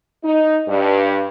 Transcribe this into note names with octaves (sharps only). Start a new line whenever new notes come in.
D#4
G2